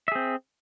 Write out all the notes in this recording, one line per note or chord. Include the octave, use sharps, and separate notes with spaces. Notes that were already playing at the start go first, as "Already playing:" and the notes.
C4 G#4 E5